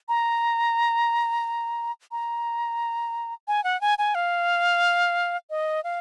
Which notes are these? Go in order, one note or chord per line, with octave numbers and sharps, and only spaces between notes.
A#5
A#5
G#5
F#5
G#5
G#5
F5
D#5
F5